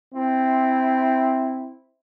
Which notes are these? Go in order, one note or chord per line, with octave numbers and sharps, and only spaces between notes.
C4 E4